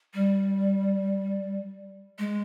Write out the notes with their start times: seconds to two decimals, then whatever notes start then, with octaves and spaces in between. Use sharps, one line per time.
0.14 G3
2.19 G#3